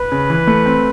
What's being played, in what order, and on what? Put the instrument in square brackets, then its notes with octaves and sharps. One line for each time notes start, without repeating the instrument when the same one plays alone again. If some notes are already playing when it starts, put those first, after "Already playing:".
Already playing: [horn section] B4
[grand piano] C#3
E3
A3
C4